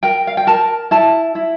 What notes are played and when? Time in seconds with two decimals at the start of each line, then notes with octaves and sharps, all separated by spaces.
0.03 A#4 G5
0.27 F5
0.37 G5
0.47 A#4 A5
0.91 E4 A5
1.35 E4